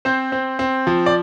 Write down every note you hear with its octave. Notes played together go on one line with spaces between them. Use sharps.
C4 C5
C4
C4
F3
D5